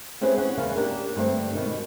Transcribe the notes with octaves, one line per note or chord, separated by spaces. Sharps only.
C4 C#4 E4 G#4 B4 C5
C#4 F#5
E2 C#3 A#3 F5
A#3 D4 G4 A#4
G2 D3 A3 C4
B2 D#3 D4